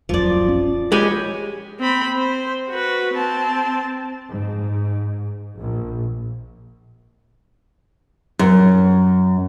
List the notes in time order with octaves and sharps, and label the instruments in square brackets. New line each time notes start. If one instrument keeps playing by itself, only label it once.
[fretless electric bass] D#1 A1 F#2 [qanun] F3 D5
[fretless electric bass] C#4
[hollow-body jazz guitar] G#3 G4 [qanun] C#5 G#5 B5
[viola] C4 B5
C5
F#4 B4
C4 A5
[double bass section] G#2
A#1
[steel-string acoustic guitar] F#2